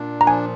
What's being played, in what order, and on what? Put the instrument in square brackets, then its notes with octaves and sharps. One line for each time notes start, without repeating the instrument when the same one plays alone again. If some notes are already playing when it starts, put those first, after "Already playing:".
Already playing: [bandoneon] A#2 D4
[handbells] A#5
[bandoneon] F3 [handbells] G#5